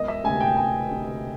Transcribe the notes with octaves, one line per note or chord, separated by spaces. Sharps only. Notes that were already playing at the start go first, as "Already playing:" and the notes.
Already playing: E1 D#5
E5
D2 C3 G#5
G5
E1 G#5
D2 C3